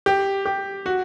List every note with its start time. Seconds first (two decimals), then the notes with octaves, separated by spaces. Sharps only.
0.06 G4
0.46 G4
0.86 F#4